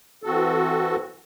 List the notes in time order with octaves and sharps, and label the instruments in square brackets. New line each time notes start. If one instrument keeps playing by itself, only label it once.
[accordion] E3 C4 F#4 A4